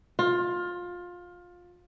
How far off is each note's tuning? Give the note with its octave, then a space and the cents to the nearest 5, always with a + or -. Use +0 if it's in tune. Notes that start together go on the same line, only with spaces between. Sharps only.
F4 +20